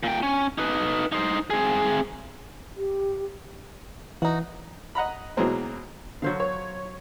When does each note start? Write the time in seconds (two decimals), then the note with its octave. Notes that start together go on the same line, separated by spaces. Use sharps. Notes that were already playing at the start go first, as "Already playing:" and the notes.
0.03 A#2 G5
0.23 C#4
0.58 D#4 B4
1.12 D#4 C5
1.50 C4 G#4
2.77 G4
4.22 E3 D#4 F#4
4.95 D#5 F#5 A#5 B5
5.37 B2 E3 F#3 G#3 A#3 C4
6.22 D3 F#3 C5 F5
6.40 C#5